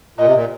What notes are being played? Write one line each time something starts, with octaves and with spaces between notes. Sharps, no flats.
A#2 D#5
C3
A#2